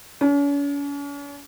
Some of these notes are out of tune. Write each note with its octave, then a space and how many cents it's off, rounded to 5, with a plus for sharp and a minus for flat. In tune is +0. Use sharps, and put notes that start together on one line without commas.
C#4 +45